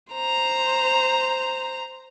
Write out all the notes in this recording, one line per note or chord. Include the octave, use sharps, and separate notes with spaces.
C5 A#5